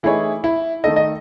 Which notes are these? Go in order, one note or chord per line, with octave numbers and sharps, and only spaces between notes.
E3 A3 D#4 E4 G#4 C#5
E4
D#3 A3 D#4 A4 D#5
D#5